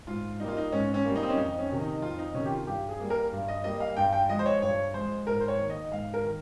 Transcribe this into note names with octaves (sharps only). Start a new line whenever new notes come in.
G#2 F4
G3 A#3 D#4 F4
D#4
G#2 C#4
C#4
G3 A#3
D#4
C4
C#4
F2 D#4
C#4
C3 D#3
D#4
F2 F4
D#4
C3 D#3 C#4
G4
F4
G2 G4
G#4
G3 A#3
A#4
G2
D#5
G3 A#3 D#5
F5
G2 G5
G5
F3 G#3 D#5
C5
C#5
G2 C#5
F3 G#3 C5
G#2 A#4
C5
C#5
D#3 A#3
D#5
G#2 F5
A#4
D#3